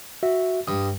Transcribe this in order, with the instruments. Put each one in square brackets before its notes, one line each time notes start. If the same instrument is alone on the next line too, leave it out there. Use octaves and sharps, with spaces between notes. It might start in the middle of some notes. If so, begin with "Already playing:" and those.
[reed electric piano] F#4 E5
[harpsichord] G2 [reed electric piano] D#6